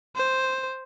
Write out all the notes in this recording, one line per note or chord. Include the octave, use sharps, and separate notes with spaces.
C5